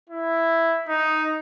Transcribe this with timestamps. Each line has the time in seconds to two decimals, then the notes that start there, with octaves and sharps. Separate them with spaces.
0.10 E4
0.88 D#4